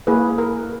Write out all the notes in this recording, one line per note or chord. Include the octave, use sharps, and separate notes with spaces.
A#3 E4 G#4 B4
A#4